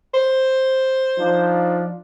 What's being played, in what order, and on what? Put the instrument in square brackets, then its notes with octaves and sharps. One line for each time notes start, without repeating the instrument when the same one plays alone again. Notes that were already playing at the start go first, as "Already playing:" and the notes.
[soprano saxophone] C5
[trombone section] F3 D4 D#4